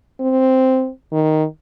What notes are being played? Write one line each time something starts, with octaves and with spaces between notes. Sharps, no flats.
C4
D#3